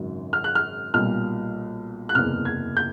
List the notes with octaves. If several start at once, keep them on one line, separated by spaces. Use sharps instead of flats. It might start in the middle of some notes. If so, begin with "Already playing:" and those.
Already playing: G#1 F#2 C#3 F#3
F6
F#6
F6
B1 A#2 G3 F6
F#6
F#1 E2 C3 F6
G#6
G6